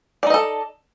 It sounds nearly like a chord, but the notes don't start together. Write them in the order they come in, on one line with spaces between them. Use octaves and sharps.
D5 D#4 D#5 A4